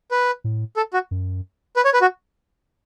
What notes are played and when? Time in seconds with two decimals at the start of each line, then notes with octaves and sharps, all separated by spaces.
0.11 B4
0.44 A2
0.77 A4
0.94 F#4
1.11 F#2
1.76 B4
1.85 C#5
1.94 B4
2.01 F#4